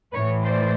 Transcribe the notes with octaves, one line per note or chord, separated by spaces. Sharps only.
A2 E3 A3 B4 C#5
C5 D5